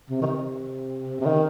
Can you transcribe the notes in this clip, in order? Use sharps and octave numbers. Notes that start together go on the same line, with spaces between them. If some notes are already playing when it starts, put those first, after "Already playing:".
C3
D#3
C3
C3
D#3